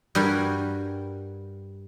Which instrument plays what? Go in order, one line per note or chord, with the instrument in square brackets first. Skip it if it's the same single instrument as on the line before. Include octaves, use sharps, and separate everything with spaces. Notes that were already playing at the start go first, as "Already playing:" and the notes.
[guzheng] G2 G3 F#4 A#4 G#5